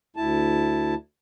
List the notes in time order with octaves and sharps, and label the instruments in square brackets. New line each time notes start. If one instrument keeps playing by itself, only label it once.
[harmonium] D2 E4 A5